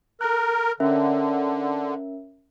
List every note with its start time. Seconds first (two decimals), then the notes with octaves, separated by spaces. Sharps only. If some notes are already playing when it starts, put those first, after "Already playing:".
0.21 A4 A#4 F#6
0.80 D3 C#4 A#4 E5